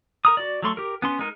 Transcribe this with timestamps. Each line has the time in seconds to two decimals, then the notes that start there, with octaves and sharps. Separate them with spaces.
0.25 A#4 A#5 D#6
0.37 F#4 D5
0.63 F#3 A3 C6 C#6
0.77 G4 A#4
1.02 B3 C#4 C6
1.19 G#3 D#4 A#4